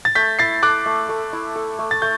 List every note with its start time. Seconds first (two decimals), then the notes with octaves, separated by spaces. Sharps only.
0.05 A6
0.15 A3 G6 B6
0.39 E4 A6 C7
0.63 A4 D6 F#6
0.86 A3
1.09 A3
1.33 E4
1.55 A4
1.79 A3
1.91 A6
2.02 A3 G6